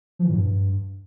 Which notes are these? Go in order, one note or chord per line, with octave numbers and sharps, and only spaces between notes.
F3
E3
A2
G2